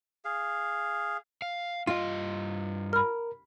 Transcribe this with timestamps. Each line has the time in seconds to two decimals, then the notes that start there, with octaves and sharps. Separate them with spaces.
0.25 G#4 F5
1.42 F5
1.87 G2 F4 D#5
2.93 A#4 B5 F6